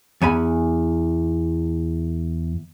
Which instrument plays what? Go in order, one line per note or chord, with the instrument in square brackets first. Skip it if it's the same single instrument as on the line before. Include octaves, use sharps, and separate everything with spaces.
[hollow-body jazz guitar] E2 G#5 B5